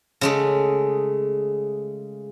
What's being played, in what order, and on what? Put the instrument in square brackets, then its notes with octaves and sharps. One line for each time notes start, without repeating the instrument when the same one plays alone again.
[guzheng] C#3 G#3 A3